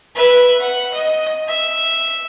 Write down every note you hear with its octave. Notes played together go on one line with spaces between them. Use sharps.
B4 E5
F#5
D#5
E5